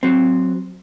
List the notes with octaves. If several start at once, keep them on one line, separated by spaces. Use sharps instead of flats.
F#3 C4